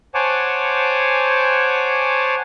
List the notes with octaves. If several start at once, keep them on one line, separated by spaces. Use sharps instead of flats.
C5 C#5 F#5 G#5 A5 D6